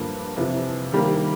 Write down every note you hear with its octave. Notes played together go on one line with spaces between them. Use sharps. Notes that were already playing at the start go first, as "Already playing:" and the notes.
Already playing: G2 D3 F3 A#3
F2 C3 E3
D#3 G3 A#3